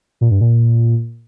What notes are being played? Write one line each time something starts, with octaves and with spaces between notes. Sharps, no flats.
A#2
G2
A#2